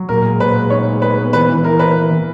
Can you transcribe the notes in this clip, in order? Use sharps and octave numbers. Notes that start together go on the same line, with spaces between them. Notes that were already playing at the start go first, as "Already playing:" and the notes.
Already playing: F#3
A#2 A#4
G#3
A#2 B4
G#3
D#4 C#5
G#3
G#3 B4
B3
E3 B4
E3
E4 A#4
A#3 B4
A#3
E3